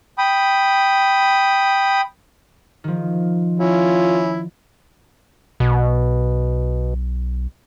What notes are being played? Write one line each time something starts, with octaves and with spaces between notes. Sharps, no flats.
G5 B5 D#6
D#3 F3
C#4 E4 F4
B1 B2